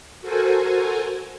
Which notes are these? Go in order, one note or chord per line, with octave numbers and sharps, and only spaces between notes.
F#4 A4 A#4 C5 G#5